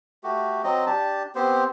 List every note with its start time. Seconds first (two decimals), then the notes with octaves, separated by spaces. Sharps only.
0.24 A3 F#4 G4
0.64 F#3 C4 D#5
0.86 D4 G4 A5
1.35 B3 C4 G4 C5